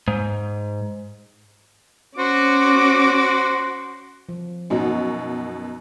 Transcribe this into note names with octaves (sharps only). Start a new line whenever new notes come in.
G#2
C#4 F#4 C5 D6
F3
F#2 B2 D#4 F#4 D#5